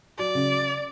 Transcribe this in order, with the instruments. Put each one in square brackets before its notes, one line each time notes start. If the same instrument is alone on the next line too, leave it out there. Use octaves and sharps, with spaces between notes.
[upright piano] F#3 [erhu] D5
[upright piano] C#3